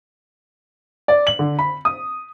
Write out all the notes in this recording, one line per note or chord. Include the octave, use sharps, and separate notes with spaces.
D5
F#7
D3
B5
D#6